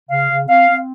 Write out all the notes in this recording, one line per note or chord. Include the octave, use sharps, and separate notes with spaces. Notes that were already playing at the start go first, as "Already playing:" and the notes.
C#3 F5
C#3
C4 F5
C4